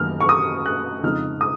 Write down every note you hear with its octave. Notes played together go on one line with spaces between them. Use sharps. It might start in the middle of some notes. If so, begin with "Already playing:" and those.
Already playing: F#2 D#3 F#3 A#3 F6
C#6
D#6
F#6
F2 C#3 G#3 D#4 F6
D#6